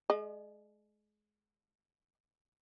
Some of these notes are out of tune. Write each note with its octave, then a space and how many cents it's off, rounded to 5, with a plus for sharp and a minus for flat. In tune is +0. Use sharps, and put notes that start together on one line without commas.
G#3 +30 D#5 -45